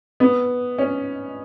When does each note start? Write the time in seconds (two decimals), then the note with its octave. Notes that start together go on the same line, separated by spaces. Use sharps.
0.20 B3
0.78 C#4